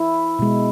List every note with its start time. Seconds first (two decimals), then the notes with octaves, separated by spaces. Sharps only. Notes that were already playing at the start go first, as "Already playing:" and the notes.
Already playing: E4
0.39 B2 G#3